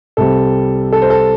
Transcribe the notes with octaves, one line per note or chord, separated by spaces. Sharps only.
C2 C3 G3 C4 A4
A4
C5
A4